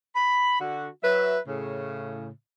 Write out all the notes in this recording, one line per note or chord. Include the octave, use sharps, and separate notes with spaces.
B5
D3 F#4
F#3 B4 E5
A2 C#3